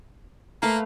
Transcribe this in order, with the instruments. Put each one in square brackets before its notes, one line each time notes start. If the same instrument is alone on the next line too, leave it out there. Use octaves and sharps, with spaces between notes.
[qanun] A3 B4 F5 [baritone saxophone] A#3